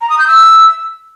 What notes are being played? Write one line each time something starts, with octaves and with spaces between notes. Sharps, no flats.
A#5
D#6
G6
E6